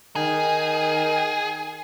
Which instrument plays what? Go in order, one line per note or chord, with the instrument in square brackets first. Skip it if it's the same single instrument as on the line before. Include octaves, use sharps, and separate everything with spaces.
[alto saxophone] D#3 [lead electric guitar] G#4